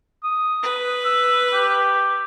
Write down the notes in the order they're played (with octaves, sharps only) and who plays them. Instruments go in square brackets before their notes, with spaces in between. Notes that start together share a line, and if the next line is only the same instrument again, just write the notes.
[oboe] D#6
[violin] B4
[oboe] E6
G4